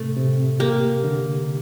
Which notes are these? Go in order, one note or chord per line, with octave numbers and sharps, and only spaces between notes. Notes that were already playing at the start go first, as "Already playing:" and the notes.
Already playing: A2 C3 A3
C3
A#3 G4
D3